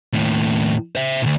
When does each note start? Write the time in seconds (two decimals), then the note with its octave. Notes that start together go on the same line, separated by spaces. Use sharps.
0.13 D#2 A2
0.95 C5 E5
1.21 D2 A#2